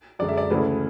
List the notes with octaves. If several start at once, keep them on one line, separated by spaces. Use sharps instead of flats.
F#2 D3 G#3 D5
E5
D5
D2 C#3 E3 A3 B4